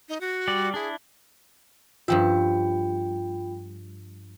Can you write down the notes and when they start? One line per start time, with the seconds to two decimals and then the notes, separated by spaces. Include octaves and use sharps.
0.09 D#4
0.21 F#4
0.48 G3 D5
0.74 D4 E4 G#4
2.08 G2 F3 F4 E5 G5